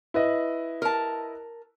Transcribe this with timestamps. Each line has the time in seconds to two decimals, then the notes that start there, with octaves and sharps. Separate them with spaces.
0.14 E4 B4 D#5
0.82 A#4 A5